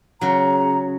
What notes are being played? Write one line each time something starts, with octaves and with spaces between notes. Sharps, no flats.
C#3 F#3 A#5